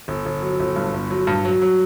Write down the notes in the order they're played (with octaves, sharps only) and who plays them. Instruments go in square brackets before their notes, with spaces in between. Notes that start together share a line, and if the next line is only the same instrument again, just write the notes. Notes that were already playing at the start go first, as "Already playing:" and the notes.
[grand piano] G1
G1
F#3
G1
G2
G1
F#3
G2
F#3
F#3